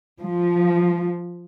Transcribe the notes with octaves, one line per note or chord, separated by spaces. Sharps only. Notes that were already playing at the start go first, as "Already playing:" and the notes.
F3